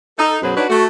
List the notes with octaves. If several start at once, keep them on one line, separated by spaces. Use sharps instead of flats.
D#4 A4
F#2 B2 F#3 G#4 B4 C5
D4 D#4 F#4 B4 C#5
A3 F#4